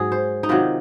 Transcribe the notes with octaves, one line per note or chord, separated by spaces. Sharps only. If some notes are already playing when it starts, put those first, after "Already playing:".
Already playing: G#2 F#3 G#4
C5
D#4
C3 D#3 F#3 F4